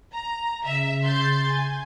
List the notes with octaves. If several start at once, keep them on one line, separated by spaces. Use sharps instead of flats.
A#5
C#3 E5
C6 G6 A6
G#5